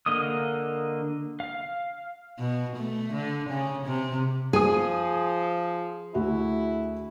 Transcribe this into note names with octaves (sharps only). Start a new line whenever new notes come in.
D3 A#3 D#5 D#6
F5
B2
A3
D3
C#3
C3
F3 G#4 G#5 D#6
D2 E4 F#4 E5